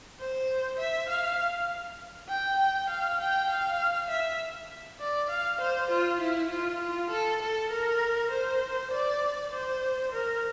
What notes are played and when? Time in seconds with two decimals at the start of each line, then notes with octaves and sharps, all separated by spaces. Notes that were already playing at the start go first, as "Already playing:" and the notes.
0.19 C5
0.79 E5
1.09 F5
2.29 G5
2.60 G5
2.90 F5
3.20 G5
3.50 F5
4.10 E5
5.00 D5
5.30 F5
5.61 C5
5.91 F4
6.21 E4
6.51 F4
6.81 F4
7.11 A4
7.42 A4
7.72 A#4
8.31 C5
8.91 D5
9.52 C5
10.12 A#4